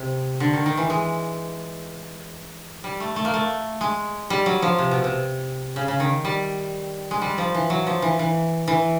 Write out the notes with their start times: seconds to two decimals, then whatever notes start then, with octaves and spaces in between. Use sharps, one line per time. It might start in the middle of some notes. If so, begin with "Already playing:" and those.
Already playing: C3
0.40 D3
0.53 D#3
0.66 D#3
0.77 E3
0.90 G#3
2.84 G3
3.00 A3
3.16 A3
3.25 A#3
3.34 A3
3.81 G#3
4.30 G3
4.46 F#3
4.62 F3
4.78 C3
4.91 B2
5.04 C3
5.76 C#3
5.88 C#3
6.00 D#3
6.25 G3
7.11 G#3
7.22 G3
7.38 F3
7.54 E3
7.70 F#3
7.87 F3
8.02 E3
8.19 E3
8.68 E3